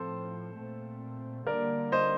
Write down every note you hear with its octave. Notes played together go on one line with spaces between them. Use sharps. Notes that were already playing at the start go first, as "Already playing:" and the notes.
Already playing: A2 F3 C4 A4 C5
A#2 A3 C4
D3 G3 A#3 A#4 D5
C5 D#5